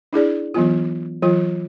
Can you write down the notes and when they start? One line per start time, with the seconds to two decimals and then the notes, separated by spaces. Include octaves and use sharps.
0.13 D4 E4 G#4 D5
0.54 E3 F#3 B3 F4
1.22 E3 F#3 F4